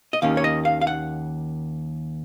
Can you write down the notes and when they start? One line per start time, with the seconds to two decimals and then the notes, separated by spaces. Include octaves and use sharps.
0.13 D#5
0.22 D#2 D#3 A#3 C#4 F5
0.37 C#5
0.44 D#5
0.65 F5
0.81 F5
0.87 F#5